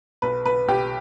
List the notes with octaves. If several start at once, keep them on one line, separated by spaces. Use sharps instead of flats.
B1 B4
B1 B4
B1 G4